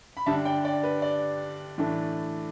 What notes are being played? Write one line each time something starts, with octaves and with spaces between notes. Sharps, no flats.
B5
G2 D3 G3 D4 E5 A5
D5 G5
D5 G5
B4
D5
A2 E3 A3 D4